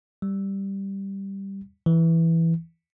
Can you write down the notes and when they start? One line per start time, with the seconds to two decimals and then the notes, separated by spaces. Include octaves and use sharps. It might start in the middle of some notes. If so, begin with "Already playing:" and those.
0.22 G3
1.86 E3